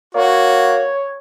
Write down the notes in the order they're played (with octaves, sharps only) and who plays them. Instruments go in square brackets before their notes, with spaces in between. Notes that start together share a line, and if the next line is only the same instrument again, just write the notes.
[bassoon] A#3 [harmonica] F#4 [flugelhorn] C#5